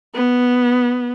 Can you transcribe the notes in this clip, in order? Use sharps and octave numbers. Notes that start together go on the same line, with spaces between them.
B3